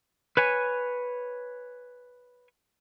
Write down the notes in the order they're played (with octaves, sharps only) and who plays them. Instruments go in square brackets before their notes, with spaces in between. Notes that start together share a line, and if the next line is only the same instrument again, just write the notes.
[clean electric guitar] B4 C#5 G#5